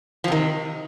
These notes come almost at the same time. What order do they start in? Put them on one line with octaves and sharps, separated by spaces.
F3 C3 D#3